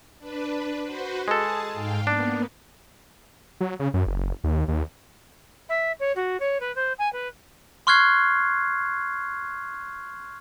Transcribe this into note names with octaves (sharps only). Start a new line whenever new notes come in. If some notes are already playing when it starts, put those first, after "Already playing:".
D4 B4
F#4 B4 C5
G#3 G#4 A4 A5
G#2 F5 G5
A#3 B3 D4
F#3
C#3
F#2
F#1
D#2
D#2
E5
C#5
F#4
C#5
B4
C5
G#5
B4
C6 C#6 F6 F#6 G#6 C7